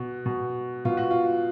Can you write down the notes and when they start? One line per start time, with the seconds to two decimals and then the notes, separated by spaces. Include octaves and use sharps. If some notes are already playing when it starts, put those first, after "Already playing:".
Already playing: B2 F#4
0.26 B2
0.85 B2 F4
0.97 F#4
1.11 F4